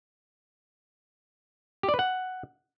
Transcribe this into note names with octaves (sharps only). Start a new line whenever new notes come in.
G4
D5
B4
F#5